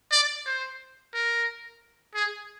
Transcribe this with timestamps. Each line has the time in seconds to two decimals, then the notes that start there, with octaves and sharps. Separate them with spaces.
0.11 D5
0.46 C5
1.14 A#4
2.14 G#4